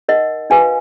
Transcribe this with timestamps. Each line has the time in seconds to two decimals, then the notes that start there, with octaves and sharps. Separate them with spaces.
0.08 D#4 A#4 D#5 F#5
0.50 D#4 F#4 B4 F5 G#5